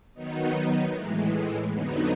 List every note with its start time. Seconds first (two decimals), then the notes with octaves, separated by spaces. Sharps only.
0.14 D#3 F#3 B3 D#4
0.93 A2 E3 G#3
1.71 F2 D3 F#3 B3 D#4